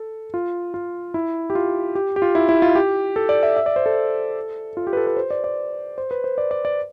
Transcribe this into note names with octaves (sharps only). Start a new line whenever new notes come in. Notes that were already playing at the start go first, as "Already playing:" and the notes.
Already playing: A4
F4
F4
E4
G4
F4
G4
G4
F4
E4
E4
F4
G4
A4
D5
E5
E5
D5
C5
A4
F4
G4
B4
A4
B4
C5
D5
D5
C5
B4
C5
D5
D5
D5